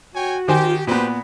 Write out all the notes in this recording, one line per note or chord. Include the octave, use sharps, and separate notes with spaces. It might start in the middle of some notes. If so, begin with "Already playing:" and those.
F#4 C#5 G5 G#5
D#3 G4 C5 G#5
A#2 B3 G4 B4 C5